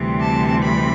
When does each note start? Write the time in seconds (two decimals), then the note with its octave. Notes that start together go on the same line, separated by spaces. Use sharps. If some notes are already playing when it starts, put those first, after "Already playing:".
Already playing: D2 C3 E3 G3 C4
0.21 A5
0.63 B5